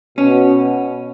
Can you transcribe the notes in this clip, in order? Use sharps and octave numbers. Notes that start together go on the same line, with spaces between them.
B2 C#4